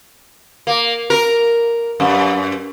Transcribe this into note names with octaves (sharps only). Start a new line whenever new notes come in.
A#3
A#4
F#2